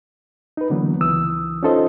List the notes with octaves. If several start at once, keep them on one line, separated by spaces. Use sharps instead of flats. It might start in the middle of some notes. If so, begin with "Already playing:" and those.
D#4 B4
D3 E3 F#3 A#3 B3
C#2 E3 D#6 E6
C#4 D#4 F4 A4 C5 D#5